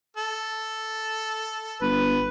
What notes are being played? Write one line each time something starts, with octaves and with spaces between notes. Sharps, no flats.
A4
G1 B4